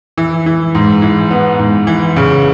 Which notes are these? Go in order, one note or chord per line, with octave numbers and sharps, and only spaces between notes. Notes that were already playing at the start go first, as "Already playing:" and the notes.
E3
E3
G#2
E3
B3
G#2
E3
C#3